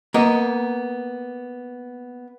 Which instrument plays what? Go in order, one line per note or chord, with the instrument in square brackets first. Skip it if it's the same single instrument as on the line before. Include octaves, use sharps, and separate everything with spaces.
[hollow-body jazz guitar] A#3 B3 D#5